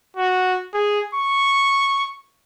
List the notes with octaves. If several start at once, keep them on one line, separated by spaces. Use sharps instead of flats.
F#4
G#4
C#6